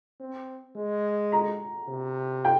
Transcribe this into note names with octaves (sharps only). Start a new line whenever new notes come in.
C4
G#3
A#5
C3
G5